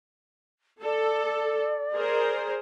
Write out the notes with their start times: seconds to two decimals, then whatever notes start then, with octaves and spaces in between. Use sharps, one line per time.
0.83 A4 D5
1.95 G#4 A#4 C5